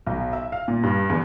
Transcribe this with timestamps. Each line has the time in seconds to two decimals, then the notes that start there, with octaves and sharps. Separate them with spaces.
0.07 B1
0.33 E5
0.52 F5
0.68 A#2
0.83 G2
1.10 E2